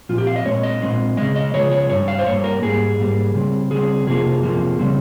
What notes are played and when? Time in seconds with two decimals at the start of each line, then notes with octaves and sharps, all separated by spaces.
0.09 A#2 F3 C4 F4
0.18 G4
0.27 F5
0.36 D#5
0.45 A#2 G#3 C4 C#5
0.63 D#5
0.82 A#2 G#3 C4
1.17 C#3 F3 G#3 D#5
1.36 D#5
1.54 C#3 F3 G#3 C#5
1.71 C#5
1.90 G2 G3 C#5
2.08 F5
2.19 C5
2.26 G2 G3 A#3 C#5
2.44 A#4
2.62 G#2 G3 A#3 G#4
2.98 G#2 G3 A#3
3.35 C#3 G3 C4
3.71 C#3 G3 C4 G#4
4.06 F2 C3 F3 A#3 G#4
4.43 F2 C3 F3 A#3
4.79 C#3 G3 C4